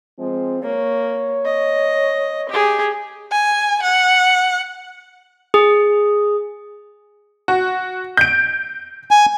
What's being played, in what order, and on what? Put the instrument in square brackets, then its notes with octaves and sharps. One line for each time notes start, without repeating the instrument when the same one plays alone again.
[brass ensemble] F3 G#3 C4
[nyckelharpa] A#3 [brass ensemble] C#5
[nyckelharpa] D#5
G4 G#4
[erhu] G#5
F#5
[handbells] G#4
[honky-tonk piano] F#4
G6 D7
[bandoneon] G#5